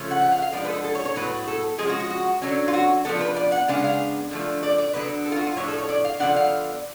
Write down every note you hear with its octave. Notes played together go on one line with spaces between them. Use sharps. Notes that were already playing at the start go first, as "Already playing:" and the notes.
Already playing: C#3 F3 A3 C#4
F#5
F#5
F5
F5
F3 G#3 B3 D4 D5
B4
A4
A4
C#5
C#5
A2 F#3 B3 B4
A4
F3 G#3 C#4 G#4
F#4
F#4
F#4
D3 F#3 C#4
F4
F#4
F3 B3 D4 A4
B4
D5
F#5
C#3 G#3 B3 D4 F5
F5
D3 F3 A3
D5
D5
D3 F#3 B3 D4 B4
A4
F4
F#4
F4
A2 F3 A3 D4 C#5
A4
C#5
D5
F5
D3 F3 B3 D4 F#5
F5